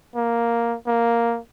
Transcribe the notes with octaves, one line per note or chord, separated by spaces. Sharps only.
A#3
A#3